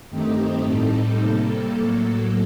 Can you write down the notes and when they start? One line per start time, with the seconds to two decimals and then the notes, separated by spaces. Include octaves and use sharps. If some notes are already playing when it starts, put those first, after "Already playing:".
0.10 G2 D#3 A3 C4 D#4 G4
0.65 A2 G3 C4 D#4 A4
1.20 C3 G3 A#3 A4
1.75 A2 F#3 A#3 A4